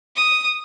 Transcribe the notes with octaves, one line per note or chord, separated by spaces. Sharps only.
D#6